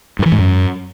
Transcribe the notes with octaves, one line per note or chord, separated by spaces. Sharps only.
G2
E3
G#2
F#2